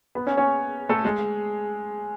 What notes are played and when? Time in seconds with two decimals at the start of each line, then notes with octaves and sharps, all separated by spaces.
0.15 B3 B4
0.27 C#4 C#5
0.37 C#4 C#5
0.89 A3 A4
1.04 G#3 G#4